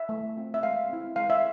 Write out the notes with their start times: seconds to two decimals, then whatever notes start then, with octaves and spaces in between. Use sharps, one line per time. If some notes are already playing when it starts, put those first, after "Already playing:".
Already playing: E5
0.09 A3
0.37 C4 F4
0.54 E5
0.63 G#3 F5
0.89 C4 E4
1.16 G#3 F5
1.30 E5